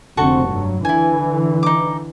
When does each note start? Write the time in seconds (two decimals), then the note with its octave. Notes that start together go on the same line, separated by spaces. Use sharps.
0.17 F1 D3 C4 F#4 A4 C#6
0.46 G2 F#3
0.85 D3 E3 E4 G#5
1.63 D#4 D6